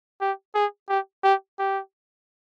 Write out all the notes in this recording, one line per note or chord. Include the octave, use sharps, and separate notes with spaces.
G4
G#4
G4
G4
G4